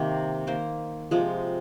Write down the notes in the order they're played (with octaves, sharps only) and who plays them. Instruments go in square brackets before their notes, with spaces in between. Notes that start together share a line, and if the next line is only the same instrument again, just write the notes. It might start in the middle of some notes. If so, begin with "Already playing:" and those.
Already playing: [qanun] C3 D#3 A#3
D#3 A#3 C5
C3 F3 G#3